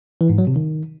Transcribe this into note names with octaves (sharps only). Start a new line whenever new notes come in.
E3
G#2
F#3
C3
D#3